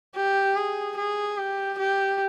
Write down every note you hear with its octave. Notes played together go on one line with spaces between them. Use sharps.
G4
G#4
G#4
G4
G4